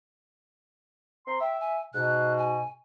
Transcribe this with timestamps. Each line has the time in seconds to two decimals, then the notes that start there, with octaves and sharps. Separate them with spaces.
1.27 C4 A#5 C6
1.41 E5 G5
1.60 G#5
1.94 G#2 B2 F#6
2.37 G#5